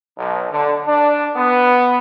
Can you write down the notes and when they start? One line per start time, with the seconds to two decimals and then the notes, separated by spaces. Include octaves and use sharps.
0.18 B1
0.51 D3
0.87 D4
1.36 B3